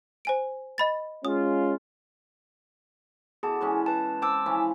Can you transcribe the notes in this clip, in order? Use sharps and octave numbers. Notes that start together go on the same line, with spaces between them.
C5 G#5 D7
D#5 B5 A6
G#3 C#4 F4 D#6
B2 G#4 A4 A5 D6
E3 G#3 C#4
B4 A5
C4 A5 D6 E6
E3 F3 C#4